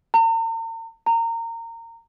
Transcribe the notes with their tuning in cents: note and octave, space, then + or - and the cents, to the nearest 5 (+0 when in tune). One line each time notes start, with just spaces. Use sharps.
A#5 -45
A#5 -25